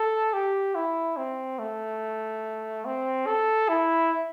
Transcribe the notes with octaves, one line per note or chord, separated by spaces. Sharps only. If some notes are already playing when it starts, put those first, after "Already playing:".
Already playing: A4
G4
E4
C4
A3
C4
A4
E4